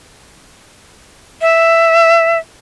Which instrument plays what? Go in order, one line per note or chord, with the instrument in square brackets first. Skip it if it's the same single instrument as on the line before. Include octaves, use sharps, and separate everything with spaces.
[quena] E5